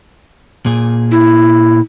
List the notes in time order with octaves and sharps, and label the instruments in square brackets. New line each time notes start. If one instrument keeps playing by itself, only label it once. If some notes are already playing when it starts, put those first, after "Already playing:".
[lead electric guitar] A#2 G#4
[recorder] E4